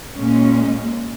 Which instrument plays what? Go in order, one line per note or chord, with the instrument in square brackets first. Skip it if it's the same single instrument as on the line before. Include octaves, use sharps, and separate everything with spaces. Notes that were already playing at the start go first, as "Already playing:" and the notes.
[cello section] A#2 G#3 C#4